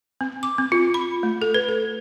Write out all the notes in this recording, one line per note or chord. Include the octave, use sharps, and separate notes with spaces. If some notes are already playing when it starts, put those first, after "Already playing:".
C4
D6
C4
F4
B5
A3
A4
B4
A4